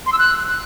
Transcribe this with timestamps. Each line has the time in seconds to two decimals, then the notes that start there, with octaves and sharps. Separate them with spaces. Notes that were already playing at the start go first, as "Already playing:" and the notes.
0.06 C6
0.12 E6
0.19 F#6